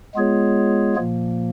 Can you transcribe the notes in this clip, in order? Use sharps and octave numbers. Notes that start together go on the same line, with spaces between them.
G#3 B3 F4 G#4 C#5
A#2 F3 A#3